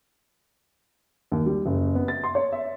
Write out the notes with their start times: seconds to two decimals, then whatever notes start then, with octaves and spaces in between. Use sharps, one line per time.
1.32 D#2
1.46 G3
1.66 F#1
1.95 B3
2.08 A6
2.24 C6
2.35 C#5
2.52 E5